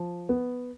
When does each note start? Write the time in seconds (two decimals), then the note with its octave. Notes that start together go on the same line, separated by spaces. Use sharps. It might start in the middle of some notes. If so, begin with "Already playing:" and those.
Already playing: F3
0.29 B3